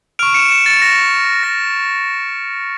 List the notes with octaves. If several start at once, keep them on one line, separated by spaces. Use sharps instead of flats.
C#6 F6 D7 F7
C#7 E7
C#7 E7
A6 C#7
A#6
A#6